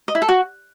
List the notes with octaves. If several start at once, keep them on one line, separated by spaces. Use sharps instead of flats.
D#5
E4
A4
F#4